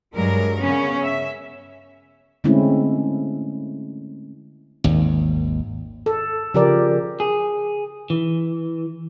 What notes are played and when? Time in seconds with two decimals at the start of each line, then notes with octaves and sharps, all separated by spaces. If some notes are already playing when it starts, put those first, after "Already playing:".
0.14 G2 F#3 G#3 A#4
0.59 C#3 B3 C#4
1.03 E5
2.44 D3 G#3 A3 C4 C#4 E4
4.84 G#1 D#2
6.06 A4
6.54 C#3 F3 G4 A#4 D5
7.20 G#4
8.10 E3